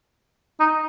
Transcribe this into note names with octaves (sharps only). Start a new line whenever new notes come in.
D#4